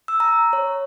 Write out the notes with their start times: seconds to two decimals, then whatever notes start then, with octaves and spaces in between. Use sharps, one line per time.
0.08 E6
0.20 A#5
0.53 C#5